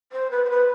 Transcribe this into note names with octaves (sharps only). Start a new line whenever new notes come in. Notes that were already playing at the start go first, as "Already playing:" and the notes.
C5
B4
C5
B4